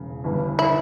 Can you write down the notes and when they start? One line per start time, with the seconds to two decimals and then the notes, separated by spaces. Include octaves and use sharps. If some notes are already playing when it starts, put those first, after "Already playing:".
Already playing: E1 C#3
0.24 G1 G2 E3
0.59 E4